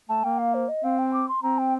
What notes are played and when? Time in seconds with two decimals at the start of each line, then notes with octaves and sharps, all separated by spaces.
0.09 A3 A5
0.24 A#3 G5
0.38 F5
0.54 C5
0.68 D#5
0.84 C4 F5
0.98 G5
1.14 D6
1.29 C6
1.43 C4 A#5
1.58 G5